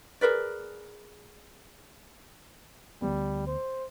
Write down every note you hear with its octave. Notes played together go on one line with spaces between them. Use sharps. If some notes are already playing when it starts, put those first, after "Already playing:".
G#4 A#4 B4 D5
D2 G3 G#3 B3
C5